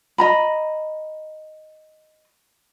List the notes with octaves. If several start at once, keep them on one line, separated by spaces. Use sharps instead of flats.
D#5 A#5 B5